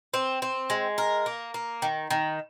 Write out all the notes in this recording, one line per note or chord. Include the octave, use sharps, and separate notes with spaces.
C4
C4
G#3
A#4
A#3
A#3
D#3
D#3